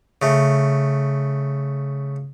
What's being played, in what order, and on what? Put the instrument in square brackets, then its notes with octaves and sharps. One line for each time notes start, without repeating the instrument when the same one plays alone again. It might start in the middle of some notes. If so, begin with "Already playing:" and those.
[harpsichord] C#3 A3